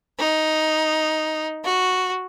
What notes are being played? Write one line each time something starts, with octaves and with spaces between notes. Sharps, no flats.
D#4
F#4